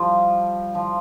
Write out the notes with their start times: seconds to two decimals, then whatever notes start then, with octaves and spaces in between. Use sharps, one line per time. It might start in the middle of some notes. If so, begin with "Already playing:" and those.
Already playing: F3 G3
0.75 F3